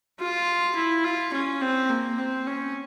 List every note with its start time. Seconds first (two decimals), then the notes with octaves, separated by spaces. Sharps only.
0.20 F4
0.76 E4
1.04 F4
1.33 C#4
1.61 C4
1.90 A#3
2.18 C4
2.47 C#4